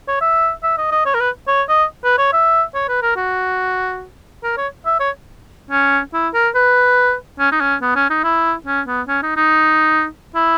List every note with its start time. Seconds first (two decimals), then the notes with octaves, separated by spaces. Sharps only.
0.08 C#5
0.21 E5
0.63 E5
0.78 D#5
0.92 D#5
1.06 C#5
1.15 A#4
1.20 B4
1.48 C#5
1.69 D#5
2.05 B4
2.19 C#5
2.33 E5
2.75 C#5
2.89 B4
3.03 A#4
3.17 F#4
4.44 A#4
4.58 C#5
4.86 E5
5.00 C#5
5.71 C#4
6.14 E4
6.34 A#4
6.55 B4
7.39 C#4
7.52 D#4
7.61 C#4
7.82 B3
7.96 C#4
8.10 D#4
8.24 E4
8.66 C#4
8.87 B3
9.08 C#4
9.23 D#4
9.37 D#4
10.35 E4